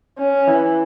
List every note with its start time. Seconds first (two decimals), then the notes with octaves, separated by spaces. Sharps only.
0.18 C#4
0.47 E3